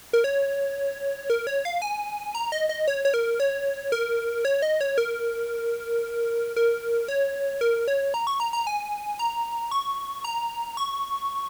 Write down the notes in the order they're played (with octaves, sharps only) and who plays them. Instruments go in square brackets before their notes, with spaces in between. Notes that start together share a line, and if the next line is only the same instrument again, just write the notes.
[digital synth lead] A#4
C#5
A#4
C#5
F5
G#5
A#5
D#5
D#5
C#5
C#5
A#4
C#5
A#4
C#5
D#5
C#5
A#4
A#4
C#5
A#4
C#5
A#5
C#6
A#5
A#5
G#5
A#5
C#6
A#5
C#6